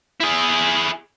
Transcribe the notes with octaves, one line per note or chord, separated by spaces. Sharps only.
E4 G#4